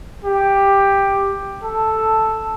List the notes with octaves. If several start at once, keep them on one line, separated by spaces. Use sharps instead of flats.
G4
A4